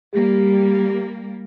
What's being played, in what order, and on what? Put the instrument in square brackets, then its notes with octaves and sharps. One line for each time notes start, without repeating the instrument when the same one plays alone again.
[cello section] G3 A#3 [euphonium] G4